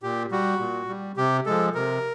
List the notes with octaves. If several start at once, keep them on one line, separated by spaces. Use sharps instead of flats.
A#2 G4
G3 F#4
A#2
G3
C3 G4
F3 G#3 A4
C3 A#4